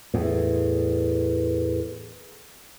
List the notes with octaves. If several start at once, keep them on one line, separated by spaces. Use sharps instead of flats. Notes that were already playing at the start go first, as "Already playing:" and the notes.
E2 A2